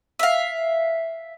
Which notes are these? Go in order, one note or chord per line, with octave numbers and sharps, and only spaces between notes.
E5 F5